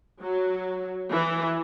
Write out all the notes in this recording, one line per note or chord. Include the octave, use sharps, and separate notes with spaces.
F#3
E3